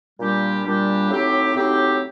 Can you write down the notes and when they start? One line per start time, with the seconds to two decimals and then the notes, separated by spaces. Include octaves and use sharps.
0.20 A#2 G3 D4 G4
0.65 A#2 G3 D4 G4
1.10 A2 F#3 C4 D#4 G4
1.54 A2 F#3 C4 D#4 G4